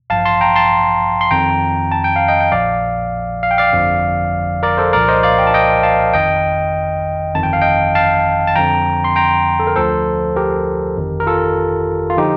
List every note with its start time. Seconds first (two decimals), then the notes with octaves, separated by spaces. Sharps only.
0.10 A1 G2 F3 F5 A5
0.25 A5 C6
0.41 G5 A#5
0.56 A5 C6
1.21 C6
1.31 F2 D#3 G5 A#5
1.92 A5
2.04 G5
2.16 F5
2.28 D#5 G5
2.41 G5
2.52 A#1 A#2 F3 D5 F5
3.43 F5
3.51 G5
3.58 D5 F5
3.73 G1 F2 D3 F3
4.63 A#4 D5
4.78 A4 C5
4.93 C2 A#2 F3 A#4 D5
5.08 C5 D#5
5.23 D5 F5
5.39 G5
5.47 A5
5.54 D#5 G5
5.83 F5 A5
6.13 G1 F2 D#3 D#5 G5
7.35 G1 F2 D#3 A5
7.43 G5
7.53 F5
7.62 D#5 G5
7.95 F5 A5
8.47 A5
8.55 F2 D3 F3 G5 A#5
9.04 C6
9.16 G5 A#5
9.59 A4
9.67 A#4
9.76 D2 D3 F3 A4 C5
10.36 G4 A#4
10.98 G1 F2 D#3
11.20 A#4
11.27 F4 A4
12.10 F4
12.18 D3 F3 D#4 G4